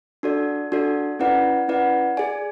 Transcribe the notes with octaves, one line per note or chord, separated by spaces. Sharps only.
D4 F#4 A4 D5
D4 F#4 A4 D5
C#4 E4 B4 D5 F#5
C#4 E4 B4 D5 F#5
G#4 D5 G#5